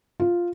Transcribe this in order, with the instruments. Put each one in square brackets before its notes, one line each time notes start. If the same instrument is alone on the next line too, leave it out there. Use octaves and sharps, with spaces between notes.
[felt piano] F4